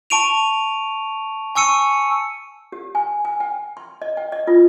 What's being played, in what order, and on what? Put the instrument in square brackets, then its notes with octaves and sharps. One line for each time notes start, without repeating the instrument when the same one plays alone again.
[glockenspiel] A5 C#6 D7 D#7 F7
G#5 C#6 E6 C#7 D#7
[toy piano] G4
G#5
G#5
G5
C6
D#5
G5
D#5
F4